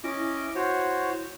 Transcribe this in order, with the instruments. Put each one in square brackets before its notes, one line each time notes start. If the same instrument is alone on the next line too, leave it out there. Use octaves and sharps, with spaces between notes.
[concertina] C#4 D#5 D6 [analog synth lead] E4
[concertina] F#4 C5 C#5